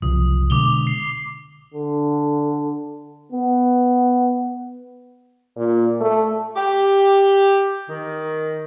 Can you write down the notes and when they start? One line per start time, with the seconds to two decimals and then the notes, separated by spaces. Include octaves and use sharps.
0.02 F#1 C2 F3 D#6
0.50 B2 D3 G#3 D6 F7 G7
0.87 C7
1.74 D3
3.32 B3
5.57 A#2
6.01 A3
6.56 G4
7.89 D#3